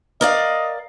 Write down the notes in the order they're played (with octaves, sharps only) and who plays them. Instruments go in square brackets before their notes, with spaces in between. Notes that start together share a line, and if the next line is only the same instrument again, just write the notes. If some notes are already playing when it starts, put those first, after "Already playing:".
[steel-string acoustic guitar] A#4 D5 F5 [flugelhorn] D#5